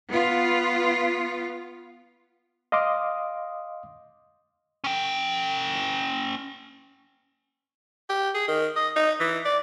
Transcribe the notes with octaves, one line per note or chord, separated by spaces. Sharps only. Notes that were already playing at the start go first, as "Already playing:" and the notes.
B3 F4
D#5 F5 C6 D6 D#6
C#4 G5
G4
G#4
D#3
D#5
D#4
E3
D5